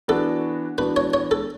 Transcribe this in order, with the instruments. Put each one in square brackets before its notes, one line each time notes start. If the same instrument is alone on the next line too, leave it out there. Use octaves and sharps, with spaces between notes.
[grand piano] E3 B3 D4 F#4 [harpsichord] A4
[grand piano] E3 B3 D4 F#4 [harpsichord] B4
[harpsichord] C#5
C#5
A4